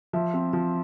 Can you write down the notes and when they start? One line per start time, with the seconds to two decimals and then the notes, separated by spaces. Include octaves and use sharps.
0.13 F3 E5
0.34 C4
0.53 F3